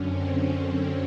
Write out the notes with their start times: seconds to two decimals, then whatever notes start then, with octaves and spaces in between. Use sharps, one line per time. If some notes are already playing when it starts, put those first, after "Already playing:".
Already playing: F#2 D3 C#4
0.09 C4